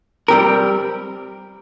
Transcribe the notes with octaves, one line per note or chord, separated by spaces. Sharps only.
G3 C4 G4 A#4